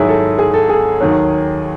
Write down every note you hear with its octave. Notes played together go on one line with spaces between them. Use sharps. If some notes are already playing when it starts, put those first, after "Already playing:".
Already playing: G#2 D#3 F#3 E4 G#4
A4
G#4
A4
G#4
D#2 D#3 F#3